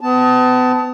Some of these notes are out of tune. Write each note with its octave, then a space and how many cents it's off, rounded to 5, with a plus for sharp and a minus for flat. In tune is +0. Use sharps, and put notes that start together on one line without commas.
B3 +35 A5 +0